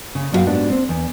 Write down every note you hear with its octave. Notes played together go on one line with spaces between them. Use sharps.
C#3
F#2 D4 F#4 A4 F5 G5
G#2 B3 D4 F#4 G4
C4 C5
E2